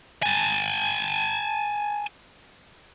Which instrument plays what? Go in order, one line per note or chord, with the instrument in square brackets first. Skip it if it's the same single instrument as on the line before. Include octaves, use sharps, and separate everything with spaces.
[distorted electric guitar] G#5 A5